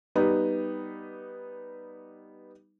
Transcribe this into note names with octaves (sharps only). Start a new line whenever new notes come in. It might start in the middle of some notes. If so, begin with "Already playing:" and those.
G3 B3 D#4